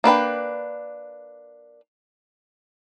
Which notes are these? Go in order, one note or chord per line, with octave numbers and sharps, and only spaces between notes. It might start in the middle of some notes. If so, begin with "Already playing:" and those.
A#3 D4 B4 G5